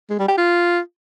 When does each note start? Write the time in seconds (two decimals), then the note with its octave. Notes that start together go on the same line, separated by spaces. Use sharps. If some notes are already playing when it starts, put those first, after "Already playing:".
0.10 G#3
0.19 G3
0.28 G4
0.38 F4